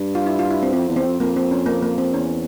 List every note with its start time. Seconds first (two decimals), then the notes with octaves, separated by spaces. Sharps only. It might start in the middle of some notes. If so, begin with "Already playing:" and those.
Already playing: G2
0.15 F4
0.26 E4
0.39 F4
0.50 E4
0.63 C4
0.73 F2 C4
0.89 E2
0.96 C4
1.05 F2
1.20 F2 A#3
1.36 C4
1.51 C#4
1.66 A#3
1.82 A#3
1.98 C4
2.13 E2 C#4